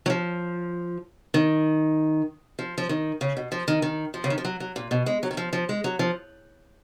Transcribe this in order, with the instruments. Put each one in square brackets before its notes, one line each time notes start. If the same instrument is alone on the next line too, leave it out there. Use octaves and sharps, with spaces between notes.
[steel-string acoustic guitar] F#3
F3
D#3
F3
F3
D#3
C#3
B2
F3
D#3
D#3
F3
C#3
D#3
F3
F#3
F#3
A#2
B2
G#3
F#3
D#3
F3
F3
G#3
F#3
F3